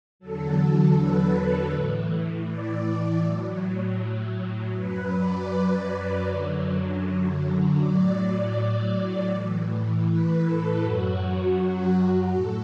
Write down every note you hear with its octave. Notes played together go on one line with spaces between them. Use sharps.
E2 D3 F#3 A4
B4
A2 E3
D5
A2 F#3
F#2 F#3 B4
D5
F#2 D3 F#3
A2 F#3 D5
D5
D5
A2 E3
B4
A4
F#2 F#3 F#4
A2 A4